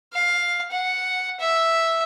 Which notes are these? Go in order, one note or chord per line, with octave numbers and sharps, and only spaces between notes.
F5
F#5
E5